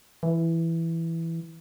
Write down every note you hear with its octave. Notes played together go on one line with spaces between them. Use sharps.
E3